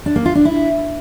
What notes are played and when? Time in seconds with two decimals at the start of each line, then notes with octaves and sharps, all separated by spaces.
0.06 D4
0.16 A#3
0.26 F4
0.35 D4
0.45 E4